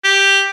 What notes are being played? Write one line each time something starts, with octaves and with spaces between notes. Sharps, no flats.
G4